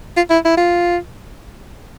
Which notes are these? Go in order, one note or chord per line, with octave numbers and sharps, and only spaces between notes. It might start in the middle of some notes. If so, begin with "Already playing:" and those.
F4
E4
E4
F4